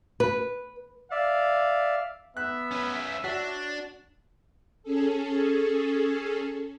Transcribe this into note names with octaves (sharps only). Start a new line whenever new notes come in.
B4
D5 E5 F5
B3 E5 F#6
C#4 B4
D4 F#4 C#5
C#4 G#4 A4